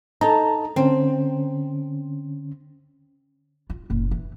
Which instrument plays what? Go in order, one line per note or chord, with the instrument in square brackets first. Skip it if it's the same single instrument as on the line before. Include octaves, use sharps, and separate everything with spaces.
[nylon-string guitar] D#4 [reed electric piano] A4 A5 A#5
[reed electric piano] D3 C#4 [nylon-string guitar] C4
[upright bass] F4
F#1 A#2
E3